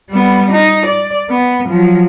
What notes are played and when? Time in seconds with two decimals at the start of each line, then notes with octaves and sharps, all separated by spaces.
0.11 G3 B3
0.52 D#4
0.86 D5
1.30 B3
1.68 F3 F#3